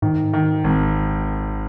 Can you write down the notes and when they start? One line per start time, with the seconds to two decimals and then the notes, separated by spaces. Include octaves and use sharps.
0.02 G#2 D#3
0.33 D#3
0.64 G#1